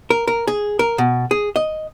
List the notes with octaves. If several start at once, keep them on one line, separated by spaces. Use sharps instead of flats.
A#4
A#4
G#4
A#4
B2
G#4
D#5